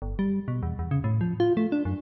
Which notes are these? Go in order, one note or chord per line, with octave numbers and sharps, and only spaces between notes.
G1
G3
B2
E2
E2
C#3
A2
F3
F4
A3
D4
F#2